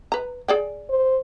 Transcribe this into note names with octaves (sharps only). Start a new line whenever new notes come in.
B4 A#5
G#4 D5 G5
C5